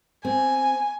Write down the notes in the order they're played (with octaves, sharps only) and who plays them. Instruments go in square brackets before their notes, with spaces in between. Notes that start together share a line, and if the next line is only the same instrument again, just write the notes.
[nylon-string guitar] C4 [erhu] G#5